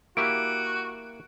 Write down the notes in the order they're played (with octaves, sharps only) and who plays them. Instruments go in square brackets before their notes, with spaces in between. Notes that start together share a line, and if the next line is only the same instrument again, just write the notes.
[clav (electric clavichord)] A#3 E4 G4 [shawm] F#4 [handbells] D7